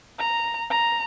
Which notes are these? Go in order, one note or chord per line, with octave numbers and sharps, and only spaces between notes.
A#5
A#5